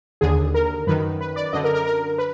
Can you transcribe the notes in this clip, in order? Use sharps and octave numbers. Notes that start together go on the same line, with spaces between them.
D#2 D3 G#4
A#4
F#2 D#3 B4
B4
D5
F#2 D3 D#5
A#4
A#4
A#4
B4